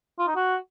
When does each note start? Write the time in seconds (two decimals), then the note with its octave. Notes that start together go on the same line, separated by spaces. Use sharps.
0.19 F4
0.27 D#4
0.36 F#4